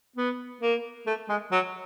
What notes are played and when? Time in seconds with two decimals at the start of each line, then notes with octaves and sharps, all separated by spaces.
0.16 B3
0.61 A#3
1.06 A3
1.29 G#3
1.52 F#3